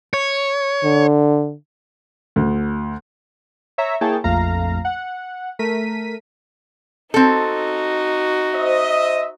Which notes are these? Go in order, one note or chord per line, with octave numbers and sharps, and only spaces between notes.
C#5
D3
D2
C#5 E5 A#5
A#3 E4 G#4 C#5 G5 A5
A#1 F2 A3 F5 A#5
F#5
A3 A#4 B6 D#7
C4 D#4 F#4 A4
C5 D#5 E5